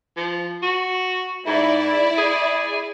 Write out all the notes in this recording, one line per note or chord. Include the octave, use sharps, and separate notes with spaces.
F3
F#4
G#2 E4 D5
G#4